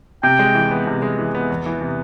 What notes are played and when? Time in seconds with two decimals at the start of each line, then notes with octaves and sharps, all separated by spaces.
0.23 C3 G5
0.39 G#3
0.55 E3
0.71 B3
0.87 C3
1.02 G#3
1.18 E3
1.35 B3
1.50 E2
1.66 E3
1.81 C3